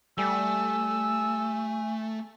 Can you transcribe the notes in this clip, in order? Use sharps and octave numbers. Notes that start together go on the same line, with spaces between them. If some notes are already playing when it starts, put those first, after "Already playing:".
G3 A3 G#5 E6